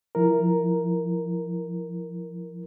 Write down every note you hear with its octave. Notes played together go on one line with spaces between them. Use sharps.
F3 E4 A#4